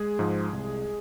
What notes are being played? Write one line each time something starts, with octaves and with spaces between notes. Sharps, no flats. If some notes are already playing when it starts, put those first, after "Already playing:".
Already playing: G#3 G#4
G#2 F3
C2